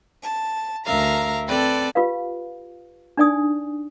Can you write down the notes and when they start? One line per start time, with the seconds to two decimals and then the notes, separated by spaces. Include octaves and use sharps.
0.22 A5
0.85 D2 A#4 E5 F5 A#5
1.48 C4 A4 B4 D5 G5
1.95 F4 G4 B4 F5
3.17 D4 D#4 D5 G#5 D#6